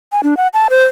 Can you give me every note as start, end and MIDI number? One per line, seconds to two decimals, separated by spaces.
0.12 0.21 80
0.23 0.37 62
0.37 0.48 78
0.54 0.68 81
0.70 0.85 72